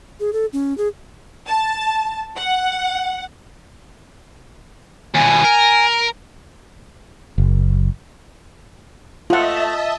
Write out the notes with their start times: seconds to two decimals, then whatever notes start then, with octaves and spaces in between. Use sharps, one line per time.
0.20 G#4
0.33 A4
0.53 C#4
0.78 G#4
1.47 A5
2.37 F#5
5.14 D#2 B2 G#5
5.44 A#4
7.38 F#1
9.30 F3 A3 F4 D#5 E5 F#5 A5